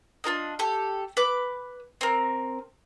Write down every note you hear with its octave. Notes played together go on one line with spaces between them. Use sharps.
D4 F4 A#4 D#5
G4 A4
B4 D6
C4 A#4